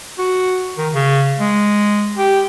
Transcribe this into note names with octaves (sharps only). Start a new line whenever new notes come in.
F#4
D#3
C#3
G#3
G4